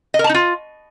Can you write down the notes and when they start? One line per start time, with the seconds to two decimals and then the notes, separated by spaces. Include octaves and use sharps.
0.14 D#5
0.19 A#4
0.24 A5
0.29 D#4
0.35 F4